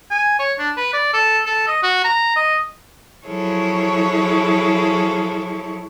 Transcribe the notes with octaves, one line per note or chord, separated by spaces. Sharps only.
G#5
C#5
D4
B4
D5
A4
A4
D#5
F#4
A#5
D#5
F3 F#3 E4 G#4 A4 C#5